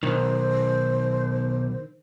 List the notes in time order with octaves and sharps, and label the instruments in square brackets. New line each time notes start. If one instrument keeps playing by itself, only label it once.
[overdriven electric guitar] B1 [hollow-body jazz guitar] D#3 [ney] C5